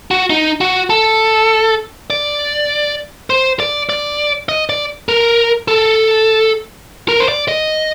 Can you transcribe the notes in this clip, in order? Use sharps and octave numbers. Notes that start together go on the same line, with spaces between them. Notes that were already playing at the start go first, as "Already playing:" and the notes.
F#4
D#4
F#4
A4
D5
C5
D5
D5
D#5
D5
A#4
A4
A#4
C5
D5
D#5